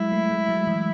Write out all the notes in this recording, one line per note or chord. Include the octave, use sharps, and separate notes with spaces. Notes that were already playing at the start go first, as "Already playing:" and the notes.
Already playing: F#3 G#3 E4
A3
G#3
F#3
E3